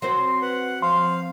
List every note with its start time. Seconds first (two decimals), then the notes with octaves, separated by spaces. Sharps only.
0.02 F#3 C4 C5 C6
0.42 B4 F#5
0.82 F3 F5 C6